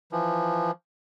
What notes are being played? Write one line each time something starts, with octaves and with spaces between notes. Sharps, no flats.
E3 F3